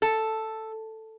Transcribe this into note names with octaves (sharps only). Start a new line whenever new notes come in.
A4